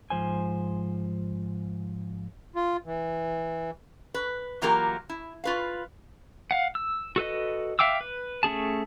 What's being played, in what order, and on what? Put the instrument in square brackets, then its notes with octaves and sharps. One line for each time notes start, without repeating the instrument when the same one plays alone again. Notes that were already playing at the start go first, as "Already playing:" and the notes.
[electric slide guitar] G#2 F3 C5 G#5
[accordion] F4
E3
[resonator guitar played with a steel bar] B4
E3 F#3 A#3 F4 G4 A#4
E4
F4 B4 F5
[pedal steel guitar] F5 F#5
E6
F#4 A4 B4 D#5
E5 F5 G5 D6 E6
B4
A3 C#4 G#4 A5